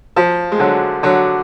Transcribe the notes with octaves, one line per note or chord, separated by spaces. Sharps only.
F3
G#3
D3 F#3
D3 F#3